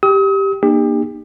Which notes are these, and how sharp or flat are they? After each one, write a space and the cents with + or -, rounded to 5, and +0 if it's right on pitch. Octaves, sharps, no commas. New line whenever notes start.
G4 +0 D#6 +40
A#3 +30 D#4 -40 G4 +35